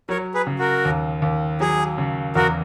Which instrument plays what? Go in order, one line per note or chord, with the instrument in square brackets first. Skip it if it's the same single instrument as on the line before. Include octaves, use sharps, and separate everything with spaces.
[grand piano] F#3 [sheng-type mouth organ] A#4 C#5
[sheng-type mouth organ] G#4 B4
[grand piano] C#3
[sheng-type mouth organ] F#4 A#4
[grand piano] D#2
D#2
[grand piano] F#3 [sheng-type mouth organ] G#4
[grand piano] C#3
[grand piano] E2 [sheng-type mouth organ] F#4 A#4